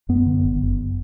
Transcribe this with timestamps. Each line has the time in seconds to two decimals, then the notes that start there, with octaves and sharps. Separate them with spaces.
0.09 F#2 B3
0.26 D3
0.44 F#1
0.62 F#1